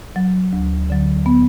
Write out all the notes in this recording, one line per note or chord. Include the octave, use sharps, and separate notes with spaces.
F#3
D2
D3 F#3
B3